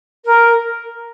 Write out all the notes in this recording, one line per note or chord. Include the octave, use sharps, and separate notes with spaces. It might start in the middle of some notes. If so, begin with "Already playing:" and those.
A#4